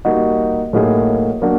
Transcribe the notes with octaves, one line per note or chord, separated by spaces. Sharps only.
G3 A#3 D#4 F#4
A2 F#3 A#3 D#4 G#4
F#3 A#3 D4 F#4